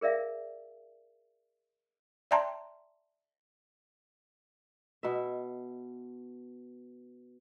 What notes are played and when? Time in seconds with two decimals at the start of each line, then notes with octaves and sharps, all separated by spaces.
0.01 G#4 A#4 D5 E5 F5
2.31 D5 E5 G5 A5 A#5 C6
5.03 B2 E5